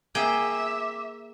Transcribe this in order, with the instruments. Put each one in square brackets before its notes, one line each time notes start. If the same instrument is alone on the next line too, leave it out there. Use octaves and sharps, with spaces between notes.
[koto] A#3 G#4 G5 [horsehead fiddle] E5 [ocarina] D6